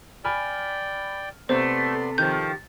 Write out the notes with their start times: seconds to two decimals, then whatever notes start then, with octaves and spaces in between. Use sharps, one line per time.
0.25 D5 G5 G#5 B5 F6
1.49 C3 A3 B3 C5 D5 C6
2.18 D#3 F3 G4 G6